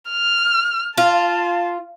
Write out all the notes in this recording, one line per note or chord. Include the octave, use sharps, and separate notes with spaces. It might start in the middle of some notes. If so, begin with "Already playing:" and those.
F6
F4 A5